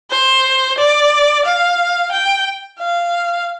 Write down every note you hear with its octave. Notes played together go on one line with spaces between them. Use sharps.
C5
D5
F5
G5
F5